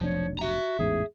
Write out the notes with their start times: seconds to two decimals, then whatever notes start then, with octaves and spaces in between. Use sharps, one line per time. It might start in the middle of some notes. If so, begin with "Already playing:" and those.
0.01 F1 B1 F3 D4 C#5
0.39 F#4 E5 A#5
0.79 A1 E2 G#2 G#4